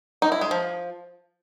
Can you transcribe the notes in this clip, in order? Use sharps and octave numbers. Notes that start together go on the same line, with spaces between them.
D#4
E4
G#3
F3